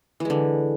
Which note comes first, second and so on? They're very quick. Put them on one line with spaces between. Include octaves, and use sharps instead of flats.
E3 G#3 D3